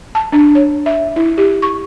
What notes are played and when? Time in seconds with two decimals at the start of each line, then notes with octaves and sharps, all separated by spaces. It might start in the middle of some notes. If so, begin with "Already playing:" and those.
0.15 A5
0.32 D4
0.55 C#5
0.86 E5
1.16 E4
1.38 G4
1.62 C#6